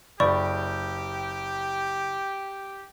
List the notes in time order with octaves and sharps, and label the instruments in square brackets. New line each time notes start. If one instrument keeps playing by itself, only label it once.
[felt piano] F#1 [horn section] G4 [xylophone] D5 B5 C#6